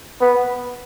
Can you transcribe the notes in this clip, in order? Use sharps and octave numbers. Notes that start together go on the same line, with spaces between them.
B3